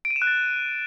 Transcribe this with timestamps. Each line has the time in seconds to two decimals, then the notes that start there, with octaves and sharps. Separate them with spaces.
0.05 D7
0.10 D#7
0.16 E7
0.22 F#6
0.27 A6